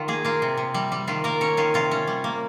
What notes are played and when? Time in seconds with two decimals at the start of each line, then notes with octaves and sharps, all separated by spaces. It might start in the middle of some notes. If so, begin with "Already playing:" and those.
Already playing: D#3 F4
0.08 A#3 G#4
0.24 A#3 F4
0.42 C3
0.57 C3
0.74 G3
0.92 G3
1.07 D#3 F4
1.24 A#3 A#4
1.41 C#4 C#5
1.57 D#3 F4
1.74 C3 F4
1.91 C#4
2.07 G3
2.24 A#3